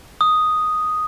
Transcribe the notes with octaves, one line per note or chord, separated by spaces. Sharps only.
D#6